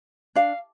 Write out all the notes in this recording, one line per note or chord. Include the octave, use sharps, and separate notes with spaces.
D4 F5